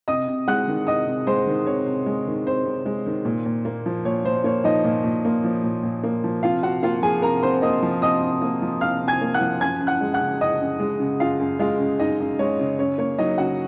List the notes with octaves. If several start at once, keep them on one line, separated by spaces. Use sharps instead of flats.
C3 D#5 D#6
C3
G#3 F#5 F#6
D#3
C3 D#5 D#6
C3
G#3 C5 C6
D#3
C3 C#5
C3
G#3
D#3
C3 C5
C3
G#3
D#3
A#2
A#2
A#3
F3
A#2 C#5
A#2 C5
A#3 C#5
F3 D#4 D#5
A#2
A#2
A#3
F3
A#2
A#2
A#3
F3
C3 F4 F5
C3 F#4 F#5
A#3 F4 F5
F3 G#4 G#5
C3 A#4 A#5
C3 C5 C6
A#3 D#5 D#6
F3
C3 D#5 D#6
C3
A#3
F3
C3 F5 F6
C3
G#5 G#6
A#3
F#5 F#6
F3
F#2 G#5 G#6
F#2
F#5 F#6
G#3
F#5 F#6
C#3
F#2 D#5 D#6
F#2
G#3
C#3
F#2 F4 F5
F#2
G#3 F4 F5
C#3
F#2 D#4 D#5
F#2
G#3 C#5
C#3
F#2 C#5
A#3 C#5
F#3 D#4 D#5
C#3 F#4 F#5